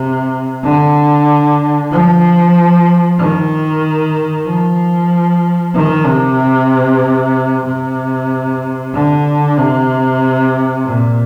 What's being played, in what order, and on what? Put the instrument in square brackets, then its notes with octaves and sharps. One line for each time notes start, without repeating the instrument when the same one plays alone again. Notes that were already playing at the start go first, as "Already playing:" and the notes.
Already playing: [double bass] C3
D3
F3
D#3
F3
D#3
C3
C3
D3
C3
A#2